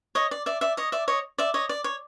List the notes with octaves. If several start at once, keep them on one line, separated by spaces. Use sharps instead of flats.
C#5 D#5
D5
D5 E5
D5 E5
C#5 D#5
D5 E5
C#5 D#5
D5 E5
C#5 D#5
D5
C#5